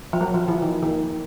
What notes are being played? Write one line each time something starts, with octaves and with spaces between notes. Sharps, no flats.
F3
F#3
F3
E3
D#3
D#3